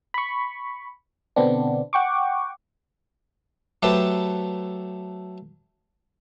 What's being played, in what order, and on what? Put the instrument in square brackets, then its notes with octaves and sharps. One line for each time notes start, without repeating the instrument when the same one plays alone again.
[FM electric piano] B5 C#6
B2 D3 B3 C4 D4
F#5 G5 C#6 D6
[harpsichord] F#3 A3 G4 A4 B4 C5